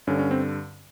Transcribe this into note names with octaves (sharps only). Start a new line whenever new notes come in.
G2 D3 C#4
C#4
C4